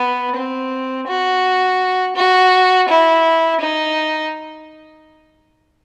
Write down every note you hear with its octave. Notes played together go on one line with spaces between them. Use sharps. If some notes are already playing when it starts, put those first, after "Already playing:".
Already playing: B3
C4
F#4
F#4
E4
D#4